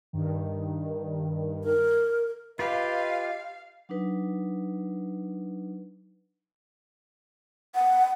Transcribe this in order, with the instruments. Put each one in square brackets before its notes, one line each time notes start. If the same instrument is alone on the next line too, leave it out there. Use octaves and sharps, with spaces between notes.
[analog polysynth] G2 D#3
[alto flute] A#4
[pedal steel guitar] F4 G4 [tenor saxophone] B4 [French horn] D#5 [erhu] F5
[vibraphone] F#3 D4 D#4 B4
[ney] F#5